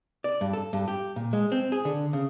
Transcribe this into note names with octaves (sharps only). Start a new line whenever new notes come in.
D5
G2
A4
G2
G4
A#2
G#3
C4
G#4
D3
C#3